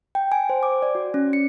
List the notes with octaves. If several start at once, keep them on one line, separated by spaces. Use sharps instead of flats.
G5
G#5
C5
D6
D5
F#4
C#4
C#7